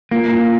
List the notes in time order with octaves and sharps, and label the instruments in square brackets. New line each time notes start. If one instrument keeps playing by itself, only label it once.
[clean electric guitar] A#3 [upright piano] F4
[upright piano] F4